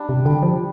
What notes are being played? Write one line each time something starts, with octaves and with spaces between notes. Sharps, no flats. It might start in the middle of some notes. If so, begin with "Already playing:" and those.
Already playing: G3 D4 G4
C3
D3 G3
F3